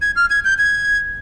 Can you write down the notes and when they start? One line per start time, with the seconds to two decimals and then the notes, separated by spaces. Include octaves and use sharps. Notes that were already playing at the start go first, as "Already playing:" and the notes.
0.02 G#6
0.16 F6
0.30 G#6
0.45 G6
0.58 G#6